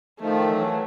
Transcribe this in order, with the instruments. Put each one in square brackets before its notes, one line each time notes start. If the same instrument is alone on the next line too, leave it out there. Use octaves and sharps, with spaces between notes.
[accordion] D#3 F3 [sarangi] A3
[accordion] E3 F#3